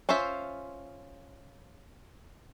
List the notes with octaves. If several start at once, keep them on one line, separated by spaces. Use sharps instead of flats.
C#4 F4 C5 E5